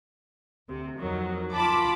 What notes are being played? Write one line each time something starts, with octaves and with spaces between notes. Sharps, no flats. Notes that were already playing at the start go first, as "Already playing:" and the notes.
D2 C3
F2 D#3 F#3
F4 A5 B5 D6